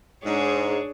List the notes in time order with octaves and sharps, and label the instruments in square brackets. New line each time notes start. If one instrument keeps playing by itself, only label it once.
[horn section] G#2 [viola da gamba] D4 G#4 C#5